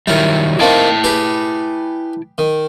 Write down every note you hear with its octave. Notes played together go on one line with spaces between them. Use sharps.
D#3 F#3 G3 E4 A#4
D#3 A#3 C4 E4 G5 A5
G4 G#4 B4
D#3